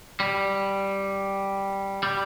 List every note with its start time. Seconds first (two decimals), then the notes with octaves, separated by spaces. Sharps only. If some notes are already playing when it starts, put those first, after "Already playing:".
0.20 G3
2.03 G3